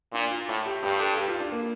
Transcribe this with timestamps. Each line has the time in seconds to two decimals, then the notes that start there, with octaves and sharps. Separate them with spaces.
0.13 A#2 D4
0.31 F4
0.48 A2
0.66 G4
0.83 G2 G4
1.00 A4
1.17 G4
1.28 F4
1.40 D4
1.51 A#3